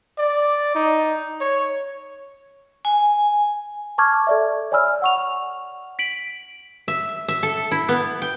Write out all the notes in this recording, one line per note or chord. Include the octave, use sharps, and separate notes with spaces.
D5
D#4
C#5
G#5
A5 C#6 D6 F6 G#6
A4 D5 E5
C#5 D5 G#5 B5 E6 F6
F#5 C#6 F7
B6 D7 F#7
E5
E5
A4
E4
B3
G5